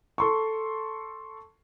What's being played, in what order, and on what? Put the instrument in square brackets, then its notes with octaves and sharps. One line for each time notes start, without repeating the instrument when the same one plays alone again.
[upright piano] A4 C6 C#6